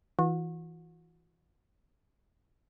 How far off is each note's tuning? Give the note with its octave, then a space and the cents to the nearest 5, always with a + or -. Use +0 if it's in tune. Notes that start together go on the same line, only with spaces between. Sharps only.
E3 -5 F#4 -35